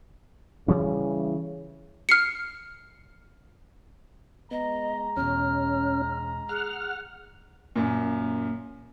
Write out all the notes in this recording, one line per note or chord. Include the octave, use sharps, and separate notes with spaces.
C#3 E3 G3 C#4
F6 C7 C#7
G#3 B3 D#5 A#5
E2 B2 C#4 F6
G#4 F#5 F6
F#2 A#2